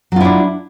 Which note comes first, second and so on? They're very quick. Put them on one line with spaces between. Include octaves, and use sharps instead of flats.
F#3 F4 E4 D4